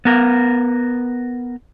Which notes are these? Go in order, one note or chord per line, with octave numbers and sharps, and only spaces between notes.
B3 A#4